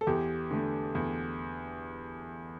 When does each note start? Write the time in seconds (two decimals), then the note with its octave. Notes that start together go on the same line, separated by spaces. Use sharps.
0.01 A4
0.07 E2 G4
0.51 D3 A3
0.95 E2